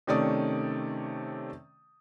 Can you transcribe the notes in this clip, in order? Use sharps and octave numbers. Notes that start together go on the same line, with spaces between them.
C3 D#3 A3 C#4 D5 D#6